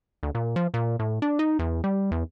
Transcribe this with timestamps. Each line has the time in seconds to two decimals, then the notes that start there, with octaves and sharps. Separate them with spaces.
0.23 D2
0.35 A#2
0.56 F3
0.74 A#2
0.99 A2
1.22 D4
1.39 D#4
1.59 E2
1.84 G3
2.11 E2